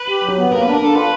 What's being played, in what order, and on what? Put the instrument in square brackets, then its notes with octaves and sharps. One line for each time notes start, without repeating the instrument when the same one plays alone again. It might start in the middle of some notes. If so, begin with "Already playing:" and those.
Already playing: [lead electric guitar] B4
[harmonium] G4
F#3
B3
[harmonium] A#3 [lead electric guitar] A#4
[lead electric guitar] B4
[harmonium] D4
[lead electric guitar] A#4
[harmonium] D4 [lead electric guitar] A4
[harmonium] F4 [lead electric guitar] B4